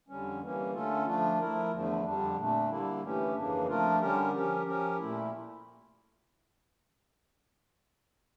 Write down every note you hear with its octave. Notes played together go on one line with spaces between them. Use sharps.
F2 D3 G3 C#4
E3 G3 A#3 C#4
D3 A3 C#4 F4 A4
F3 A3 D4 F4
F3 A3 E4 A#4
E2 D3 F3 A3
F2 D3 G3 D4
A#2 A3 D4
D3 G3 A#3 E4
G2 E3 A3 C#4 G4
F2 C#3 E3 A#3 D4
F3 A3 D4 F4 A#4
D3 G3 C#4 G4 A#4
F3 C#4 G4 A#4
F3 C#4 G4 A#4
A#2 A3 E4